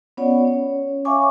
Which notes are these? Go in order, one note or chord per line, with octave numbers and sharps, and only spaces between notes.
B3 C#4 F4 C#5 D5 F#5
C#4 C#5
C#5 E5 F5 G#5 C#6 D6